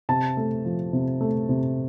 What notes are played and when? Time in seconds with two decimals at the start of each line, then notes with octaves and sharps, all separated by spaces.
0.09 C3 A5
0.37 A3
0.65 F3
0.93 C3
1.21 A3
1.49 C3